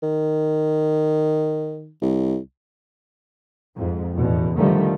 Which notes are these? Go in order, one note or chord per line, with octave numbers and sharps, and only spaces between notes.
D#3
C2
F2 G#2
A1 E2 B2
F1 D3 D#3 F3 G3 A3